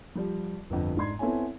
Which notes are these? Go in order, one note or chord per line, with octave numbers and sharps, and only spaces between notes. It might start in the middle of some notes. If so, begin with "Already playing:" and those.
F3 G3
G1 F2
G#2 D4 C6 G#6
B3 C4 E4 A4 C#5 G#5